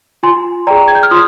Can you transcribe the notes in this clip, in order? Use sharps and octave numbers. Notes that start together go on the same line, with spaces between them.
F4 G#5 C6
G#4 D5 G5 A#5
G#6
G6
F6
F4 C6 D#6